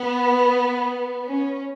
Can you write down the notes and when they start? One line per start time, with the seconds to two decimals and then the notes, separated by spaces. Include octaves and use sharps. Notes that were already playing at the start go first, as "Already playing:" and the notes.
Already playing: B3
1.27 C#4